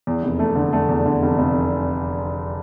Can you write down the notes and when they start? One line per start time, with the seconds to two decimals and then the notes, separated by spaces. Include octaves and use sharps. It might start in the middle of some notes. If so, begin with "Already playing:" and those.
0.07 E2
0.23 F1
0.39 A3
0.56 D3
0.73 A3
0.89 E2
1.06 D3
1.22 F1
1.38 F1